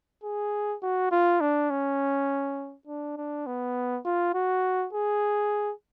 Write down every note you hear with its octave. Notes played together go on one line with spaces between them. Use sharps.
G#4
F#4
F4
D4
C#4
D4
D4
B3
F4
F#4
G#4